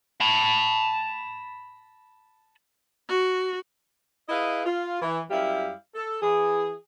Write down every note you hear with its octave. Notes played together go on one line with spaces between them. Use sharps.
A5 B5
F#4
E4 G#4 B4 D#5 F5
F4
E3
F#2 G3 E4 G4 F5
A4
E3 G#4